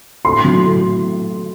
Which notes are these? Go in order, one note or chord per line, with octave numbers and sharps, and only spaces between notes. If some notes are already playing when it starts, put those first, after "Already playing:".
A2 C6
F#3
A2